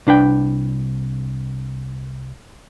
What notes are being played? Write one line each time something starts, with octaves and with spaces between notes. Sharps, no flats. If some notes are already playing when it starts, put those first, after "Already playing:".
C2 D4 B4 G5